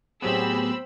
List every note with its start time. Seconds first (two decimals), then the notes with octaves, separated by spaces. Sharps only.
0.22 A2 F#3 B3 C4 G4 G#4 B5 E6